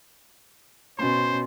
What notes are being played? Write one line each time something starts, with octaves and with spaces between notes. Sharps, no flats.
B2 C#4 C5 C6